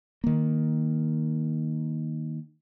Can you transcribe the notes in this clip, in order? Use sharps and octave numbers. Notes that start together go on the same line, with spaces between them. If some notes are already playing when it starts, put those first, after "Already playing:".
D#3 A#3